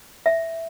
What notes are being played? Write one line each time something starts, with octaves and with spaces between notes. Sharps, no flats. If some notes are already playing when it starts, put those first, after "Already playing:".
E5